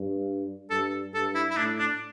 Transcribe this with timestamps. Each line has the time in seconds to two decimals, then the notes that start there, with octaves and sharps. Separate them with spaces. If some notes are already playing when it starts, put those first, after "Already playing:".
Already playing: G2
0.70 G2 A4
1.14 G2 A4
1.35 E4
1.50 E4
1.56 A2 D4
1.79 D4